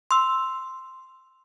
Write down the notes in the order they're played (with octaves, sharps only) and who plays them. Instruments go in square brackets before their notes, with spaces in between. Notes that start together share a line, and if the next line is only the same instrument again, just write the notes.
[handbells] C6 E6